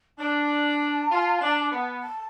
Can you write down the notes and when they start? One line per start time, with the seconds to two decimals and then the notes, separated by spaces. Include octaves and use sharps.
0.19 D4 A5
1.11 F4
1.41 D4
1.72 B3
2.02 A5